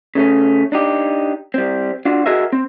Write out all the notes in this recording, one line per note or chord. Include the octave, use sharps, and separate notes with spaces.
C#3 A3 C#4
D4 D#4 G4
G3 C4
D4 F4 F#4
F#4 G#4 A#4 D#5 E5
C4